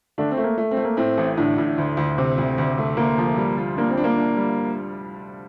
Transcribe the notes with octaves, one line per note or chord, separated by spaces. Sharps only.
D3 A3 D4
C4
A3
A#3
A3
C4
A3
A#3
A2 C4
A1
A2 D3 D4
A2
D2
D2
C3 C4
D2
D2
A3
D2 A#3
F3
G3
F4
A#3 D4
C4
D4
A#3
D4
G3